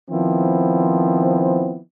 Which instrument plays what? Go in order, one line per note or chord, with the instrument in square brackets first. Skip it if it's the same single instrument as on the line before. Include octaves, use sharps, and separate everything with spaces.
[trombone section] D#3 F3 B3 C4 E4